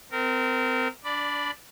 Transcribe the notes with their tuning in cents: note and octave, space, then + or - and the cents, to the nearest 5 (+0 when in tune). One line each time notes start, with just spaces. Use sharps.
C4 -30 A#4 -15
D4 -20 D5 +0 B5 +0